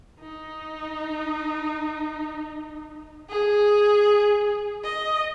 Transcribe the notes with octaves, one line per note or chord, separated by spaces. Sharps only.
D#4
G#4
D#5